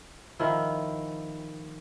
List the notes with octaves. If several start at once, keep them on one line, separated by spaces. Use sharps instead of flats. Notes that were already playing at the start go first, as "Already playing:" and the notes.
D#3 F3 E4